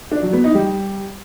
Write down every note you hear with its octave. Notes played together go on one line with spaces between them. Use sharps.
D4
F#3
B3
D#4
G3